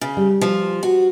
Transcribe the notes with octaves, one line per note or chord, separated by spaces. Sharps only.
C#3
G3
F3
F#4